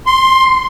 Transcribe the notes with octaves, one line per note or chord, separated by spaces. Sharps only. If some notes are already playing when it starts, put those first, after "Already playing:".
C6